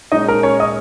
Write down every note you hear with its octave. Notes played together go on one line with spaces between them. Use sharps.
A#2 G#3 C#4 D#4 D#5
A#4
C#4 C#5
D#5 D#6